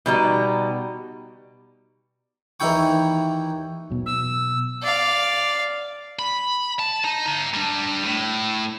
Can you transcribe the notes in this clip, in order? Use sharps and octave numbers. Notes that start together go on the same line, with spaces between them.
B2 G3 D#4
D#2 E3 D#4 E4 G5 C#6
B2 F#3
E6
D5 F5
B5
A5
D#4
G4 A#5
G3 D4
A2